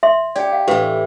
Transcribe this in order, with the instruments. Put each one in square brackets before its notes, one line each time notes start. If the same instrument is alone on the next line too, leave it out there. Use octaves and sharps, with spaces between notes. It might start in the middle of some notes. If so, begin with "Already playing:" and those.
[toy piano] E5 C6
[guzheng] G4 [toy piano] D5 G5
[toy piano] F5
[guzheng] A2 E3 [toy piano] G4 B4 F5